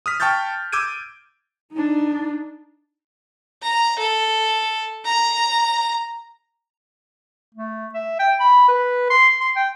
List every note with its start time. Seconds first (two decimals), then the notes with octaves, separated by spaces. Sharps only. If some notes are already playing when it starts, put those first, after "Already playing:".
0.06 D#6 F6 B6
0.20 G5 A5 C#6 F6 G6 A6
0.72 D6 E6 G6 G#6 D7 D#7
1.72 D4 D#4
3.63 A#5
3.99 A4
5.05 A#5
7.54 A3
7.94 E5
8.19 G5
8.40 B5
8.68 B4
9.10 C6
9.40 C6
9.56 G5